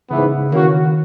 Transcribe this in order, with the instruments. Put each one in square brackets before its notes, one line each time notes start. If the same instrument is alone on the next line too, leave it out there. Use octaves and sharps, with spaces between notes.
[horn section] G#2 E3 B3 [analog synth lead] C#3
[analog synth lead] D#3 [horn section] E3 A#3 C#4 F#4